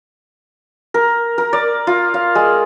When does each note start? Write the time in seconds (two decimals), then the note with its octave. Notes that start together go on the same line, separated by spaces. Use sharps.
0.94 A#4
1.38 A#4
1.53 D5
1.87 F4
2.14 F5
2.35 G#3